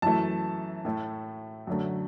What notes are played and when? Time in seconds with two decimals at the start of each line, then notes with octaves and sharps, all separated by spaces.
0.02 F#2 E3 A3 A5
0.85 A2 A3
1.67 F#2 D3 F#3 A3